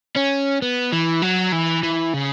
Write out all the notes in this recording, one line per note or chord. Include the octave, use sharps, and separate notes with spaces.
C#4
B3
E3
F#3
E3
E3
C#3